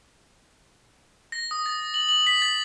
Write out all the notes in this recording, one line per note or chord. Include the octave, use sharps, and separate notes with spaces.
A#6
D#6
A6
F#7
F#7
B6
A6